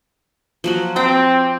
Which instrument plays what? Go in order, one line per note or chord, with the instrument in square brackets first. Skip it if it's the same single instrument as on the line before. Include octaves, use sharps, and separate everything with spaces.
[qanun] F3 F#3 F#4
[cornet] C4 [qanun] C5 G5 D6